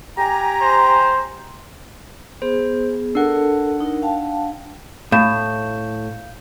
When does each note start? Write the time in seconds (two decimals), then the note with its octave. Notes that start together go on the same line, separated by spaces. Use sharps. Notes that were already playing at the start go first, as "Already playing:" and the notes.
0.17 G4 G#5 A#5
0.61 C5
2.42 B3 G#4 C5
3.15 D4 A4 A#4 F#5
3.80 D#4 A#4
4.02 F5 G5 A5
5.12 A2 F5 G6 E7